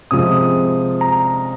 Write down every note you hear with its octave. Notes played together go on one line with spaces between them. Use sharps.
C3 F3 G#3 D#6
A#5